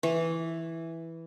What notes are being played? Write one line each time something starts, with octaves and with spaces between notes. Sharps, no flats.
E3